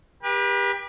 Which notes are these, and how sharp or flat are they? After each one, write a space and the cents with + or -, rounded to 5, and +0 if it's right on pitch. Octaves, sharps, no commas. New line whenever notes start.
G4 +25 B4 -35